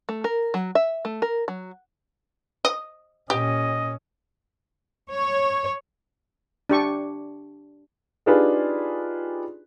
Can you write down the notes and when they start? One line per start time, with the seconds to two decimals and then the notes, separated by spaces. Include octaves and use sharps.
0.09 A3
0.24 A#4
0.54 F#3
0.75 E5
1.05 A3
1.22 A#4
1.48 F#3
2.65 D#5
3.30 A#2 C#4 G4 D#5
5.10 C#5
6.69 D4 G4 C#6
8.26 D4 D#4 F4 G4 G#4 B4